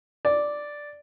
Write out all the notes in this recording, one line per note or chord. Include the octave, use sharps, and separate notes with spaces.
D5